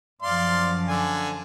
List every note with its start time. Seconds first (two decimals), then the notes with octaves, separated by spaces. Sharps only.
0.22 F#2 F3 D5 F5 C6
0.88 D3 G#5